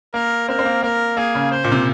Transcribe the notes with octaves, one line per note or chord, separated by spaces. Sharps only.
A#3 A#4
C4 A#4
C4
A#3
A#3 A#4
A#3 G#4
C#3
C5
A#2
C3